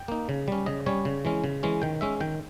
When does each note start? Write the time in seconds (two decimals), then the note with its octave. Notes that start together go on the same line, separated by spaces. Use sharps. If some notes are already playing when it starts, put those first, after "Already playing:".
Already playing: G5
0.08 A#3 D#4
0.29 C#3
0.48 G3 C#4
0.66 C#3 D#5
0.86 G3 C#4 C#5
1.05 C#3
1.25 E3 G#3 C#4
1.44 C#3
1.63 E3 G#3 C#4
1.82 D#3 G5
2.01 G#3 C#4 E5
2.20 D#3 G5